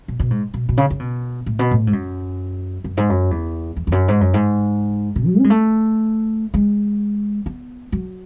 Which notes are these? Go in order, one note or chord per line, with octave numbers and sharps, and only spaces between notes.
B2
B2
G#2
B2
B2
C#3
C#3
B2
A2
B2
A2
G#2
F#2
F#2
G#2
F#2
E2
E2
E2
F#2
G#2
F#2
G#2
B2
F#3
C#4
G#3
A3
G#3
B3
F#3